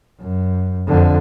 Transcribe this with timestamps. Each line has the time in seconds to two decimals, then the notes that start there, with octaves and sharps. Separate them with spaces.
0.21 F#2
0.88 F2 D3